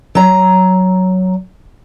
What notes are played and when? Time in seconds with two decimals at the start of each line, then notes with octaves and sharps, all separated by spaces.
0.15 F#3 A#5